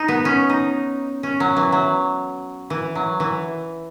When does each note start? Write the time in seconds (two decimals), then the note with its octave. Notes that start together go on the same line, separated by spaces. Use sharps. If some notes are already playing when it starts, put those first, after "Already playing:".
Already playing: D#4
0.08 B3
0.25 C#4
0.49 D#4
1.23 C#4
1.40 F#3
1.57 E3
1.72 F#3
2.70 E3
2.95 F#3
3.20 E3